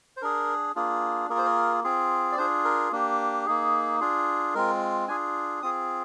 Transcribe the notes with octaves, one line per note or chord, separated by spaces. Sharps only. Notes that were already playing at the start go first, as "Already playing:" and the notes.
C5
D4 G#4 A#4
A#3 D4 F4 G#4
A#3 F4 G#4 A#4
C5
A#4
C4 F4 G#4
D5
D4 F4 G#4 C5
A#4
A#3 D4 G4
A#3 D#4 G#4
D4 F4 G#4
G#3 C4 F4 A#4
D4 F4 G#4 G#5
C4 F4 G#4 D#6